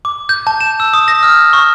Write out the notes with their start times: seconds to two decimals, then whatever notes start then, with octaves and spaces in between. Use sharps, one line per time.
0.05 D6
0.29 G6
0.47 A5
0.61 E7
0.80 E6
0.94 D#6
1.08 A#6
1.23 F6
1.53 C#6